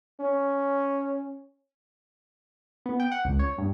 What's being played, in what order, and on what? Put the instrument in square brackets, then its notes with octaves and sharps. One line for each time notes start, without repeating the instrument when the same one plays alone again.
[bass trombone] C#4
[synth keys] B3
G5
F#5
C#2
C#5
G2